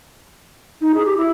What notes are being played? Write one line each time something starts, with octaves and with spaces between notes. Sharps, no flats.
D#4
G#4
G4
E4